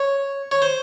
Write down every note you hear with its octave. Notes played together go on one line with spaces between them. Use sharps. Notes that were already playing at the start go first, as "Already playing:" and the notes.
Already playing: C#5
C#5
C5